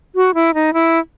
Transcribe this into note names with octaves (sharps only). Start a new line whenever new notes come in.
F#4
E4
D#4
E4